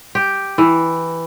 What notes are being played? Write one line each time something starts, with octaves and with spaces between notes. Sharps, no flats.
G4
E3